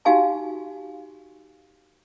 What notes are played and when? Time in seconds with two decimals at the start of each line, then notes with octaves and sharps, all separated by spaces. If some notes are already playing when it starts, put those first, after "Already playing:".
0.05 D#4 F#4 G4 F5 G#5 A5